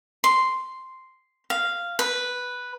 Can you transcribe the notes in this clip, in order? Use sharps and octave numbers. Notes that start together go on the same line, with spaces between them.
C6
F5
B4